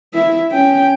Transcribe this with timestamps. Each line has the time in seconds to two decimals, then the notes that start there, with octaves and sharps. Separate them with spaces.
0.14 E4 E5
0.51 C#4 G5